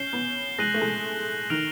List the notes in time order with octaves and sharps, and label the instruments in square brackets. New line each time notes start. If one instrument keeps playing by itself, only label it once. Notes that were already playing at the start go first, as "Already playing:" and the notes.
Already playing: [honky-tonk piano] C#4 [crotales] G6 C7 E7 G7
[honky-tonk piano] B3
[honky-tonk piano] G#3 [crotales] F#6 A#6 D#7 F#7
[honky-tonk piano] A3
G#3
[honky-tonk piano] D#3 [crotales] F6 A#6 D7 F7